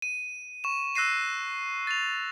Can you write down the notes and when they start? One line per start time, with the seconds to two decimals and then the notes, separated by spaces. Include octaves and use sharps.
0.02 D#7
0.64 C#6 E7
0.95 E6 F#6 A#6 C7 D#7
1.87 A6 F7